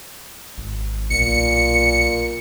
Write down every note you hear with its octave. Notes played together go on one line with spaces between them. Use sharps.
G#1
B1 A#2 C#7